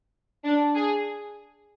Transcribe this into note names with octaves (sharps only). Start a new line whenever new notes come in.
D4
G#4